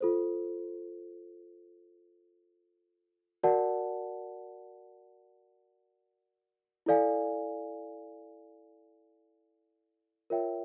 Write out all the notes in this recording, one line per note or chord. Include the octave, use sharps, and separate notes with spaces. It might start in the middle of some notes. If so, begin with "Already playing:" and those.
F4 A4 C5
F#4 A#4 D5 F#5 A5
E4 A4 D5 F5 G#5
F4 A#4 C#5 E5 G5